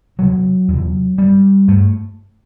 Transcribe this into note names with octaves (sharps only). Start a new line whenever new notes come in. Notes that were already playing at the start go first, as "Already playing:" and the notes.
E2 C3 F#3
E2 C3
G2 G3
G2 A3